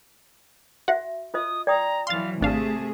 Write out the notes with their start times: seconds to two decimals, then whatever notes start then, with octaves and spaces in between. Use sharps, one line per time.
0.88 F#4 E5 F#5
1.34 F4 C5 D#5 D#6
1.67 D5 G5 A#5 D#6
2.07 E3 F#3 F5 C6 A6
2.41 G#1 C3 A3 D4 G#4 F5 A5